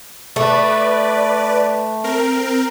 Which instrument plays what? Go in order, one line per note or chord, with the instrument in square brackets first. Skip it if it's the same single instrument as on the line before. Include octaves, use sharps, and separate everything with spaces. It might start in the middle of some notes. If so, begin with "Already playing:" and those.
[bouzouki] A3 [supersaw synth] B4 D5
[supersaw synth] C4 A#4